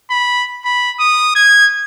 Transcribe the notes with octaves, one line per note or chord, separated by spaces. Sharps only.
B5
B5
D#6
G#6